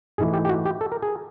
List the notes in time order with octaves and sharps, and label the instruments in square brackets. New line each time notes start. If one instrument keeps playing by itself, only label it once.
[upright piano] G#2 E3 A3 [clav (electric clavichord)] G#4
[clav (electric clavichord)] G4
G4
F#4
G4
A4
A#4
G#4